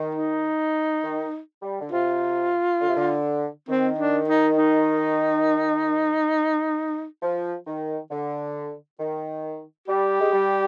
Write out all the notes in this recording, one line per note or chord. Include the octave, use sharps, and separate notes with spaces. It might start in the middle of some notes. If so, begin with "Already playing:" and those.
Already playing: D#3
D#4
D#3
G3
D3
C3 F4
D3
C3
D3
D#3 C4
D4
D#4
D#4
F3
D#3
D3
D#3
G3 G4
G#3
G3